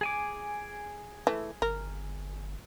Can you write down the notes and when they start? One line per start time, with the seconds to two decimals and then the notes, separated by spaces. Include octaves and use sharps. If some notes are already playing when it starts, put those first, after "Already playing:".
0.01 G#4 G#5 D6
1.27 E3 A3
1.62 G1 A#4